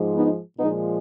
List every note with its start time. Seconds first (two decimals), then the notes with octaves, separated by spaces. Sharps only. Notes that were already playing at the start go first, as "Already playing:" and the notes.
Already playing: G#2 F3 G#3
0.12 B3 D#4
0.57 A#2 F3 G#3 B3 D#4